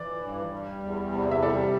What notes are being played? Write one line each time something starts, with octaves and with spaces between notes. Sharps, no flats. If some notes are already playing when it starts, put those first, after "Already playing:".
Already playing: E3 D5
G2
G3
E2
C3
E5
G3 A4 D5